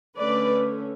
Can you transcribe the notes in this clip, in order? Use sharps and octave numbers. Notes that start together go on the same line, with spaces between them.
D3 A3 C#4 B4 D5